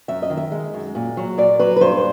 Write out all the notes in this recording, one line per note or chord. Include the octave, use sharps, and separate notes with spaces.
F#2 E5
D#5
D#3
E5
G#3
F#2
A#2
F#3
A#2 D5
F#3 B4
B4
G2 C5